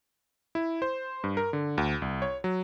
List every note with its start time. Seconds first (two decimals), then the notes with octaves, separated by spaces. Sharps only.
0.55 E4
0.82 C5
1.24 G2
1.37 A#4
1.53 D3
1.78 D2
2.02 C2
2.22 C#5
2.44 F#3